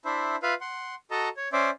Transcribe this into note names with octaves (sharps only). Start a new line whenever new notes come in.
D4 E4 C5 E5
F4 B4 E5 F5
F#5 C6
F#4 A4 D#5 A5 A#5
C#5
C#4 C5 D5 E5